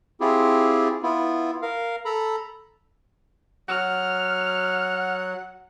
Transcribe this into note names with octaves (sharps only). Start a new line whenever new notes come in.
C4 E4 F4 G4 G#4
B3 E4 F4
A#4 F5
A4 A#5 B5
F#3 F#5 F6